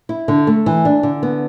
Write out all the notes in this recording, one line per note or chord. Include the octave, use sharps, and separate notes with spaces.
E4
D3
A3
E3
D4
D3
B3